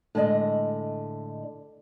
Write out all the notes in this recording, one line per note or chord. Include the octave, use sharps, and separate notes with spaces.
A2 D3 G#3 D5 D#5